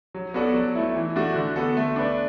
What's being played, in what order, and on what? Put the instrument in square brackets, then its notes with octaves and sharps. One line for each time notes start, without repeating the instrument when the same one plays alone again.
[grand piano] F#3
B3 F#4 A4 D5
F#3
A3 E4
E3
A3 D4 F#4
D3
B3 F#4 A4
A3
D4 B4 D5